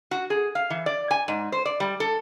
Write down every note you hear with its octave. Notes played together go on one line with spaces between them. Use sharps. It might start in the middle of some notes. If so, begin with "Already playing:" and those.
F#4
G#4
F5
E3
D5
G#5
G#2
C5
D5
G3
A4